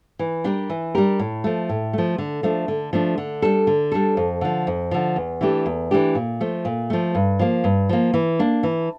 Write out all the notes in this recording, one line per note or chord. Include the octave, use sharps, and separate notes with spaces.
E3
G3 D4 G4 A#4
E3
G3 D4 G4 A#4
A2
F3 A3
A2
F3 A3
D3
F3 A3 D4
D3
F3 A3 D4
D3
G3 D4 A4
D3
G3 D4 A4
F2
D3 F3
F2
D3 F3
E2
E3 A3 D4 G4
E2
E3 A3 D4 G4
A#2
F3 A3
A#2
F3 A3
G2
F3 A#3
G2
F3 A#3
E3
A#3 D4
E3